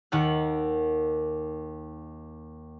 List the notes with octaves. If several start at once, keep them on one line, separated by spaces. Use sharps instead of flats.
D#2 D#3 F#5 F#6